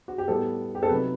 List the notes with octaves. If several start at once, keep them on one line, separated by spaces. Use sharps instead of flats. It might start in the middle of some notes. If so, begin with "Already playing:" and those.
F#4
G4
A2 G3 B3 E4 A4
G4
A4
C3 F#3 A3 D#4 B4